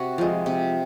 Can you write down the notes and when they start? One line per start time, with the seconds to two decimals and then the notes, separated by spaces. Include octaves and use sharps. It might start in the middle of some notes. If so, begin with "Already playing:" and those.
Already playing: C3 F#4
0.18 F3 G#3
0.46 C3